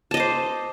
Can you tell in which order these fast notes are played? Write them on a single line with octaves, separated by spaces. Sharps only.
A5 D#5 D6 C5